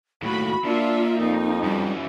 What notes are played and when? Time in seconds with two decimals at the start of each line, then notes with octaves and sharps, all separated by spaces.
0.22 D#2 A2 A3 F#4 B5
0.65 A#2 A#3 D4 F4 E5
1.20 F2 D#4
1.63 F#2 E3 G3